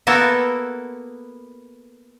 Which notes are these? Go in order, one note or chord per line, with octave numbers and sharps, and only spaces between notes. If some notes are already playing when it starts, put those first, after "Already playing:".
A#3 B3 E4 F#4 A4 E5